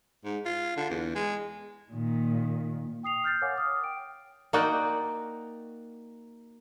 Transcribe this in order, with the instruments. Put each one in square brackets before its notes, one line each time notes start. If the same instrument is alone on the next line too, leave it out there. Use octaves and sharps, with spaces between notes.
[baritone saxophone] G#2
F4
D3
E2
G#3
[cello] A#2 D#3
[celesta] G5 D#6 C7 F7
F6 G6 A6 C7
A#4 C#5 F5 F#5 G#5 D6
D6 D#6 F6
G5 D7
[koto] A#3 D#4 F#4 D5 F#5 G5